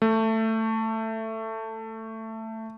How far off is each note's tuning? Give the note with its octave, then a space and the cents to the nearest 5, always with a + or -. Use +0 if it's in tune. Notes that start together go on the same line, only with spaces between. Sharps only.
A3 +15